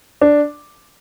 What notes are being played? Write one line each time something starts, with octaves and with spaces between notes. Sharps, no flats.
D4